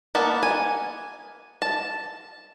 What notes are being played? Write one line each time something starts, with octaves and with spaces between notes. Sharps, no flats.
A#3 B3 A5
G#5
A5